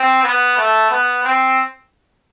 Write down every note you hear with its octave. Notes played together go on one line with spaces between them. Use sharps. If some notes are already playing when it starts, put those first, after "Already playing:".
Already playing: C4
B3
A3
B3
C4